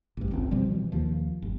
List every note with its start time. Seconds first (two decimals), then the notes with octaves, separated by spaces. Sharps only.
0.17 A1 G2
0.31 G1 C#2 C4
0.51 B2 F3 G3 C4
0.72 E3
0.92 D#2 D#3 F3
1.42 G1